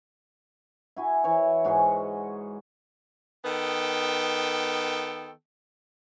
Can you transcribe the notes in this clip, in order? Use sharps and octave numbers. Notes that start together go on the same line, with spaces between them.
E4 F#4 G#5
E3 C#5
G#2 F#4 G#4 D#5
D#3 B3 A4 G5